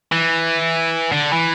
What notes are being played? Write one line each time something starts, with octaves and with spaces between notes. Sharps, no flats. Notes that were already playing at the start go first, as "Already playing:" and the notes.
E3
D3
E3